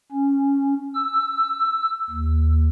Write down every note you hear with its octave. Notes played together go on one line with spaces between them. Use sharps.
C#4
E6
D#2